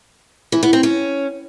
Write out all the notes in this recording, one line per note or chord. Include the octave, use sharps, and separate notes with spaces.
E3
B3
C4
C#4